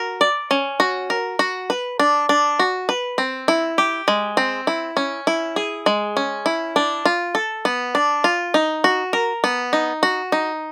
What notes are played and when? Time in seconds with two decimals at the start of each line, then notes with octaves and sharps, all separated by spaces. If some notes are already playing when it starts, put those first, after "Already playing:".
Already playing: F#4 A#4
0.21 D5
0.51 C#4
0.80 F#4
1.10 A#4
1.39 F#4
1.70 B4
2.00 D4
2.29 D4
2.59 F#4
2.89 B4
3.18 C4
3.48 E4
3.78 G4
4.08 G#3
4.37 C4
4.67 E4
4.97 C#4
5.27 E4
5.56 G#4
5.86 G#3
6.17 C#4
6.46 E4
6.76 D4
7.06 F4
7.35 A4
7.65 B3
7.95 D4
8.24 F4
8.54 D#4
8.84 F#4
9.13 A#4
9.44 B3
9.73 D#4
10.03 F#4
10.32 D#4